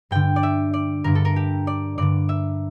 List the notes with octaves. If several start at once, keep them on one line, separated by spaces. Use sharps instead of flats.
G2 D3 G5
D5
E5
D5
G2 D3 A#4
A4
A#4
G4
D5
G2 D3 D5
E5